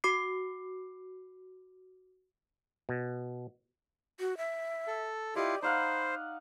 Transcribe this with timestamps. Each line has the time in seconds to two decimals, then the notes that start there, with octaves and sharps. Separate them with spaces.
0.04 F#4 D6 C7
2.89 B2
4.20 F#4
4.37 E5
4.87 A4
5.36 E4 F4 G4 D5 D#5
5.63 D#4 C5 F5 F#5 B5